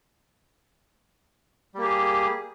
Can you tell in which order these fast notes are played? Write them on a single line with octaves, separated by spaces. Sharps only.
G3 A#3 G4 G#4